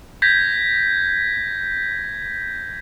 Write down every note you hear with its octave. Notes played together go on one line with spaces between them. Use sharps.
G6 G#6 A#6 B6